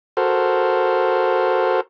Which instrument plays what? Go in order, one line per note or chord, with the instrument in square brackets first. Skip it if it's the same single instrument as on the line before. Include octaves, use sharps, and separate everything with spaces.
[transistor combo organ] F#4 A4 A#4 C5